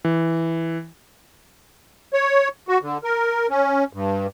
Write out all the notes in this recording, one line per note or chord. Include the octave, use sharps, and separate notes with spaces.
E3
C#5
F#4
D3
A#4
C#4
G2